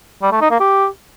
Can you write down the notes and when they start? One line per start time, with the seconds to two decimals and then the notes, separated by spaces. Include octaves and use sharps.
0.22 G3
0.32 A3
0.41 D#4
0.51 A#3
0.60 G4